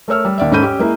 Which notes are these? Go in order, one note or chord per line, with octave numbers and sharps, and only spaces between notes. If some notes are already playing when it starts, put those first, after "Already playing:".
A3 A#4 C#5 E6 F6
G3
D#2 D5 E5
G#2 C#4 A4 B5 G6 D#7
C#4 G4
G#3 A#3 E4